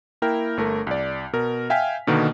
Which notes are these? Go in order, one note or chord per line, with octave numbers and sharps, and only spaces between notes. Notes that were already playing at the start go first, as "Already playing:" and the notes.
A#3 E4 A#4 G5
G1 A3 A#4
C2 D5
B2 A#4
E5 F5 G5 G#5 F6 B6
B2 D3 D#3 A#3 B3